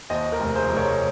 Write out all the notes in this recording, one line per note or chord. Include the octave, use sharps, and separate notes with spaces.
D#2 C5 D#5
A#4
F1
G#4 C5
F1
A#4 C#5